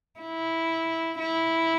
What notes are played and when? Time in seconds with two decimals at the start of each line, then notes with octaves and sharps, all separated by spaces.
0.21 E4
1.19 E4